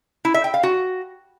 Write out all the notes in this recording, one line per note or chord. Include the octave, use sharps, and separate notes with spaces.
E4
E5
G5
F5
F#4